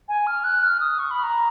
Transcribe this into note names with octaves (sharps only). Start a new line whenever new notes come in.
G#5
F6
F#6
F6
D#6
C#6
B5
A#5